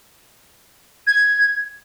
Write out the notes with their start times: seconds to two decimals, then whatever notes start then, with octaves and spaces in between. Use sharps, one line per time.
1.07 G#6